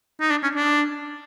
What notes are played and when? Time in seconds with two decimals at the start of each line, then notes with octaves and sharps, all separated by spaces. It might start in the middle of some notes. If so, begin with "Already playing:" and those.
0.21 D#4
0.30 D4
0.43 C#4
0.56 D4